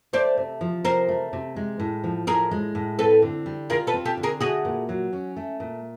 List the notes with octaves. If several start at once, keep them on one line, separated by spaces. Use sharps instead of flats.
A3 C5 D5
C3
F3
C3 A#4 C5
A3
C3
G#3
A2
F3
A2 G#4 A#4
G#3
A2
C4 A4 B4
D3
G3
F4 G#4 A#4
A4 B4
C4
G4 A4
D3
G#4 A#4
A3 F#4 G#4
A#2
F#3
C#4
A3
A#2